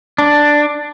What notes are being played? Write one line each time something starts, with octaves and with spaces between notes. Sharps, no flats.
D4